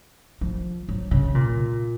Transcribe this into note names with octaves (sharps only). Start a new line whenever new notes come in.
F3
F#3
C#3
A#2